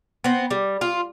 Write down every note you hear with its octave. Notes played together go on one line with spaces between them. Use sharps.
B3 C4
G3
F4